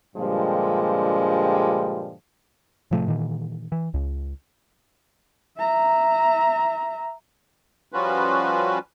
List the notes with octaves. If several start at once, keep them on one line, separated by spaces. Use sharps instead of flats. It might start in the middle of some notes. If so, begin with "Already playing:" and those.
G2 A#2 D3 F3 G3 G#3
A2 C3 F3 A3
A#2 D#3 E3
E3
C#2
E5 A#5
F3 G3 C#4 F4 F#4 B4